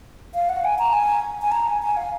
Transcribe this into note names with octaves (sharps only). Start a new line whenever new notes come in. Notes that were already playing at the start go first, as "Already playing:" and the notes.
F5
F#5
G#5
A#5
G#5
G#5
A#5
G#5
G#5
F5